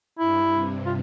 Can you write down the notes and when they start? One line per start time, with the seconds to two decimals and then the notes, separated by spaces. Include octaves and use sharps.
0.20 G2 E4
0.53 C3
0.86 F4